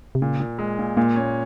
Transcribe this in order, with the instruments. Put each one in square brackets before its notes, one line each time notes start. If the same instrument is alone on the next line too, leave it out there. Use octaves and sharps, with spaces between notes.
[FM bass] C3
[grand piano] A#2 [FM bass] C#3
[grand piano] A#2
G#3
A#2
[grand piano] A#2 [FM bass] A#3
[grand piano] C#4